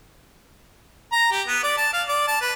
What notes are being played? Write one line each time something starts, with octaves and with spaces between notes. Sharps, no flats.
A#5
G4
B3
D5
A5
F5
D5
A5
B4